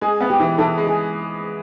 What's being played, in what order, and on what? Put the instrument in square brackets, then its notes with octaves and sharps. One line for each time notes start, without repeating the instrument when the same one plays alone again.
[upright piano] G#3 [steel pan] G#4
[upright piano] B3
[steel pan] G4
[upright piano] E3
[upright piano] E3 [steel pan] A4
[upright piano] G#3
[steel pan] G#4